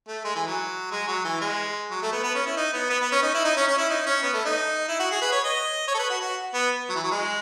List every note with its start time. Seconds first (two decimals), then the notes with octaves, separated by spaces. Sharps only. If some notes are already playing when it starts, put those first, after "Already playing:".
0.08 A3
0.24 G#3
0.36 E3
0.47 F#3
0.91 G#3
1.07 F#3
1.25 E3
1.41 G#3
1.91 F#3
2.02 A3
2.13 B3
2.23 B3
2.35 C#4
2.46 E4
2.57 D#4
2.74 B3
2.90 B3
3.01 B3
3.12 C#4
3.23 D#4
3.35 E4
3.45 D#4
3.57 C#4
3.68 C#4
3.78 E4
3.90 D#4
4.06 C#4
4.23 B3
4.34 A3
4.45 D#4
4.88 E4
4.99 F#4
5.11 G#4
5.21 B4
5.32 C#5
5.44 D#5
5.88 C#5
5.95 A4
5.99 B4
6.10 F#4
6.21 F#4
6.54 B3
6.90 F#3
6.95 E3
7.04 F#3
7.12 G#3